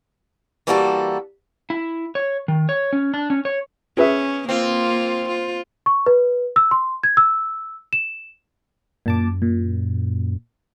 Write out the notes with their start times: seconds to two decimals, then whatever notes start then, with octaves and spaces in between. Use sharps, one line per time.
0.67 E3 G3 A#3 F#4 G4 A4
1.70 E4
2.15 C#5
2.48 D#3
2.69 C#5
2.93 C#4
3.14 D4
3.30 C#4
3.45 C#5
3.97 C#4 G#4 B4 E5
4.49 A#3 C4 F4
5.29 F4
5.86 C#6
6.06 B4
6.56 E6
6.71 C6
7.03 G#6
7.17 E6
7.93 E7
9.06 F#2 A#2 A5 D6
9.42 A#2